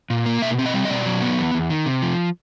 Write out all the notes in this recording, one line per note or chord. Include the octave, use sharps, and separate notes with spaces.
A#2
A#3
B2 E5
C4
D#5
G3
D#5
B2 D5
F#3
B3
E2
E2
D#3
C3
F3